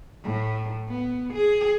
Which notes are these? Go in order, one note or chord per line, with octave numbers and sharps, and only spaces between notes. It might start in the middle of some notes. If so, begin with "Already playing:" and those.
A2
B3
G#4